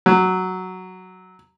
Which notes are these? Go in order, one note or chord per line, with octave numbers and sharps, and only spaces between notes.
F#3